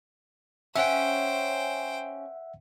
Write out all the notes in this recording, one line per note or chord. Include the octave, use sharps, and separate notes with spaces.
C#4 C5 E5 F#5 G5